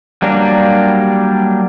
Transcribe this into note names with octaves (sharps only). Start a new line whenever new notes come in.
F#3 G3 A#3 D4